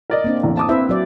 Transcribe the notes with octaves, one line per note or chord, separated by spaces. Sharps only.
A#4 D5 D#5
A#3 C4 D4
A1 E2
A5 D6 D#6
C4 E4 B4 E5
F#3 D5